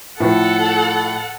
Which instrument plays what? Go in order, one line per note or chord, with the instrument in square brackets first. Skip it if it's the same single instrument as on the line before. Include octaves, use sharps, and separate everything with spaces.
[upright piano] A2 F3 [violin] A4 F#5